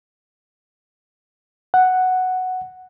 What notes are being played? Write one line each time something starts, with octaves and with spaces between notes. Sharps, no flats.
F#5